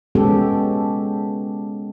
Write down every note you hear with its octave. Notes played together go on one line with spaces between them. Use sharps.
G#3 B3 C#4 G4 A4